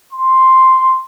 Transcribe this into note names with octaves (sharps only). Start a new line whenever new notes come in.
C6